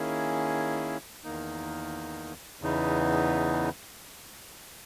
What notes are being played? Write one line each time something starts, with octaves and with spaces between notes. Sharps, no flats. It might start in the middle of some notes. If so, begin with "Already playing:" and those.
Already playing: D#3 A#3 C#4 E4 G#4
E2 D#3 A#3 D#4
E2 C#3 E3 B3 D#4